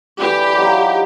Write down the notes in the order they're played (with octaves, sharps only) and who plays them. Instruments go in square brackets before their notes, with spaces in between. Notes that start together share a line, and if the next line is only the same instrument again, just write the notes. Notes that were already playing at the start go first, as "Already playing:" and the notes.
[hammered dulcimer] D3 E3 [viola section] G4
[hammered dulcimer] F3 F#3 D#4